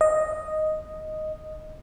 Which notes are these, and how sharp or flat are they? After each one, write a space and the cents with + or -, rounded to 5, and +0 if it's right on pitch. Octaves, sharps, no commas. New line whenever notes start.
D#5 +0